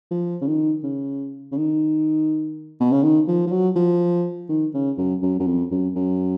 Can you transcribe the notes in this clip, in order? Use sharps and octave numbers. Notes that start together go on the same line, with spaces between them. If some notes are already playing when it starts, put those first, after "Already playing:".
F3
C#3
D#3
C#3
C#3
D#3
B2
C#3
D#3
F3
F3
F#3
F3
D#3
C#3
F#2
F#2
F#2
F2
F#2
F#2